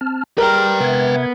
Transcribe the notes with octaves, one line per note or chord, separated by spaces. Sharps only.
C4 A5 F6
G3 G#4 A#4 B4 G5
C3 B3 E5 G#6